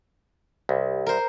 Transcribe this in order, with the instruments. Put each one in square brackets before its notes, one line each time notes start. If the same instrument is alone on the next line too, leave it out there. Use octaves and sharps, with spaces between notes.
[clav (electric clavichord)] C2
[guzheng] A#4 C5